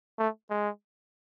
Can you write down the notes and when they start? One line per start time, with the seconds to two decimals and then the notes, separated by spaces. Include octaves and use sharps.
0.19 A3
0.50 G#3